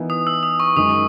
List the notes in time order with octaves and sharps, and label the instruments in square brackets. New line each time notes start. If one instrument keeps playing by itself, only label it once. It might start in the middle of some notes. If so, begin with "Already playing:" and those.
Already playing: [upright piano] E3 B3 D#4 A#4
[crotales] D#6
E6
D#6
C#6
[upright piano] F#2 D#3 G#3 D#4 [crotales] D#6